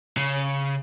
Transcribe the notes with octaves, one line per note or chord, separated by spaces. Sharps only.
C#3